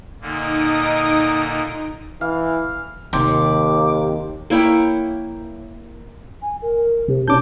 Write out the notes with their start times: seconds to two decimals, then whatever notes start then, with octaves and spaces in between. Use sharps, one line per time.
0.21 A#2 D3 A#3 D#4 D#6 D7
2.21 E3 F5
3.13 D#2 C3 D#3 D6
4.50 A#3 E4 C#5 G5
6.42 G#5
6.62 A#4
7.08 C3
7.28 B2 C#4 D4 A5 D6 G6